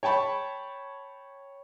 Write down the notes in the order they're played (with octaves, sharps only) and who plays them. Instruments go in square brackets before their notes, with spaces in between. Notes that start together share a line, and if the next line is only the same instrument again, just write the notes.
[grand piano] C#5 G5 A5 B5 C#6